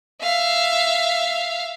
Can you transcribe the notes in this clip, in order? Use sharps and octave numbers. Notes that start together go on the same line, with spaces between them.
E5 F5